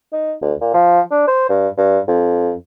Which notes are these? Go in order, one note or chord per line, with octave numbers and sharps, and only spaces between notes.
D#4
D2
A#2
F3
D4
C5
G2
G2
F2